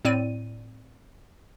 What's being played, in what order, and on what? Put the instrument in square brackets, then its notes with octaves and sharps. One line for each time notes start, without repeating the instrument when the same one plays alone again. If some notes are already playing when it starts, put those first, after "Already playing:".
[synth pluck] A2 C4 D5 D#7